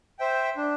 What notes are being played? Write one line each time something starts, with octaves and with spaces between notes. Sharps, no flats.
C5 E5 G5
D4